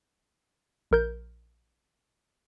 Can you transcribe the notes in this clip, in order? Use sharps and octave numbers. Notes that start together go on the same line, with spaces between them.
A#1 A#4 G6